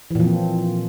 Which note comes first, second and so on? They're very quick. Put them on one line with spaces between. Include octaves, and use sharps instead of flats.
E3 A#2 F3 C4